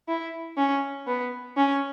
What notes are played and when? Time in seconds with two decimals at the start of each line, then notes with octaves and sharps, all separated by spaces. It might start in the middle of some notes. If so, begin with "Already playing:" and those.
0.08 E4
0.57 C#4
1.07 B3
1.56 C#4